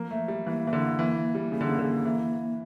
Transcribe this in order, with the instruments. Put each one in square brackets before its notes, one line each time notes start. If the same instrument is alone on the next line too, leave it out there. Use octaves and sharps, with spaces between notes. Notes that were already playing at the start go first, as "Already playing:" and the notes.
Already playing: [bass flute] F3 [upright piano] A#3
[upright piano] A3
G3
[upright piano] E3 [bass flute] A#3
[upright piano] E3
D3
E3
G3
[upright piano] C#3 [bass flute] A#3
[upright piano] D3
C#3
D3
E3